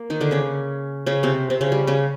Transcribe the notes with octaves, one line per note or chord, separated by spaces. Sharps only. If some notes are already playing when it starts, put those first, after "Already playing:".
Already playing: A#3
D#3 D#4
D3 D4
C#3 C#4
C#3 C#4
C3 C4
C3 C4
C#3 C#4
G3
C#3 C#4